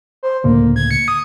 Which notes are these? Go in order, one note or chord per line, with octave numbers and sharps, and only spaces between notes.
C5
C#2 A2 D3 A#3
G#6
C#7
D#6